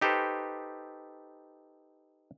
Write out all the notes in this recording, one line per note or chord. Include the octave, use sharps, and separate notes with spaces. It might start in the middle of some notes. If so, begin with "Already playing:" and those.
D#4 G4 A4 B4 C5